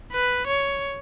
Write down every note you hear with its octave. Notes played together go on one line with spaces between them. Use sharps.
B4
C#5